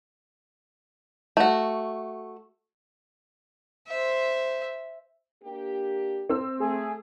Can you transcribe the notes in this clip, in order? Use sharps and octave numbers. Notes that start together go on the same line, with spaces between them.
A3 F#4
C5 E5
A#3 D4 G4
C4 E6
A3 G#4